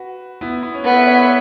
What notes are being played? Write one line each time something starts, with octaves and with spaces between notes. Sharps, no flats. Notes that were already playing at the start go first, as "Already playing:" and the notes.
Already playing: F#4 B4
B3 E4
B3
C#4
B3 E4 A4
B4 E5
C#5 F#5
B4 E5